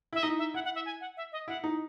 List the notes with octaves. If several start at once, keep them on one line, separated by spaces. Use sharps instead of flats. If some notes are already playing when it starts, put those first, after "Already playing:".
E4 E5
D#4 D#5
E5
E4 F#5
F#5
E5
G#5
F#5
E5
D#5
E4 F#5
D#4